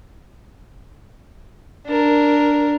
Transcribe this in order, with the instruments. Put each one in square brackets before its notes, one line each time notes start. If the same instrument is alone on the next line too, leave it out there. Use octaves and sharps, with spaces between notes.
[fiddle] D4 A#4